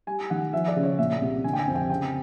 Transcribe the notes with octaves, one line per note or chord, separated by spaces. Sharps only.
G3 G#5
D#3 F#5
F3 E5
D5
C#3
C#5
A#2 E5
C2
D3 G#5
G5
G#5
F2
G5
C#3 G5